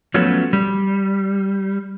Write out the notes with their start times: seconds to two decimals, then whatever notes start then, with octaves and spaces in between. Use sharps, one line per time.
0.14 F3 F#3 A3 B3 C#4
0.53 G3